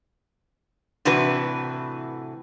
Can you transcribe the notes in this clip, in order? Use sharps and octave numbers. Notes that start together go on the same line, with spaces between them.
A2 C3 E3 D4 F#4 B4